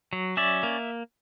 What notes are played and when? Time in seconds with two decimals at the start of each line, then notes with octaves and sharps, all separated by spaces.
0.13 F#3
0.37 C#4 D5 E5
0.63 A#3